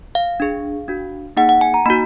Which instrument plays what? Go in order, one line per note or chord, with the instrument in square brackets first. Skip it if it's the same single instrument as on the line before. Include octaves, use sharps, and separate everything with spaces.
[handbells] F5
D4 G#4
D4 F#4
A#3 D#4 G#4 F#5
F#5
G#5
A#5
A#3 D#4 F#4 B5